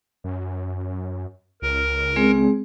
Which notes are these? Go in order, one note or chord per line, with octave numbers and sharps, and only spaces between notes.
F#2
C#2 A#4
G#3 C4 G#4